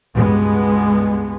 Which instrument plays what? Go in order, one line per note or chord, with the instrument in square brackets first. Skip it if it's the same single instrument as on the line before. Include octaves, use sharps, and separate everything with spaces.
[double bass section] C#2 G2 B2 G#3 B3